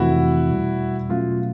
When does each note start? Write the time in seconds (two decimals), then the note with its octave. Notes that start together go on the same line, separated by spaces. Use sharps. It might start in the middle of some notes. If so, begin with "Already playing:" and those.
Already playing: F2 C3 E3 A3 C4 E4 F#4
0.49 E2 B2 G3
1.09 B2 F#3 A3 C#4 F4